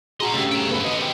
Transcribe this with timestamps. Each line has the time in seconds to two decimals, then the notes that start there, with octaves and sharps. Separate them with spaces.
0.20 F#4 G#4 D#5 F#5 A#5 C6
0.34 G2 C#3 A3 G4
0.52 C#4 G5 A#5
0.71 B3 A4 B4 C5
0.84 F#4 C5 D#5
0.98 G4 G5